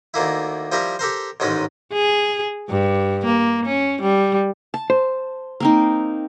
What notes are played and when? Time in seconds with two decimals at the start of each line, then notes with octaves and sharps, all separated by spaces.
0.14 D2 D#3 A#3 E4
0.72 F3 G3 E4 A#4
0.99 G4 A4 A#4 C5
1.40 A1 G#2 D#3 C#4 D#4
1.93 G#4
2.69 G2
3.25 A#3
3.66 C#4
4.02 G3
4.74 A5
4.90 C5
5.60 A#3 C4 D#4